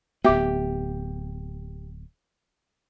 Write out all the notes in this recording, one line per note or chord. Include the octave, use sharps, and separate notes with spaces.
D1 B3 G4 E5 D6